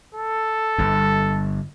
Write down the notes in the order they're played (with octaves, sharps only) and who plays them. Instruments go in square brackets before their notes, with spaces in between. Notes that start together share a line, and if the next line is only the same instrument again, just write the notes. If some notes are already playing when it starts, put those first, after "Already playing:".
[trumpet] A4
[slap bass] G1 G2